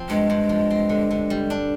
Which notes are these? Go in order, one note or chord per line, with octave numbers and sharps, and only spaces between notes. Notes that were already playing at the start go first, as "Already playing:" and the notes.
Already playing: F3 C4
G2 G#3
G2
F3
C4
D3
D3
G3
D4